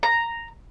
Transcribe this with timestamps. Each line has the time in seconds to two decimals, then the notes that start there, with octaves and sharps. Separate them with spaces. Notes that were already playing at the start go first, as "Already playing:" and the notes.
0.03 A#5